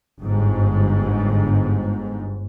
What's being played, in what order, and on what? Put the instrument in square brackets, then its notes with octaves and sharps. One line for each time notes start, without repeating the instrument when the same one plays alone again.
[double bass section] G1 G#2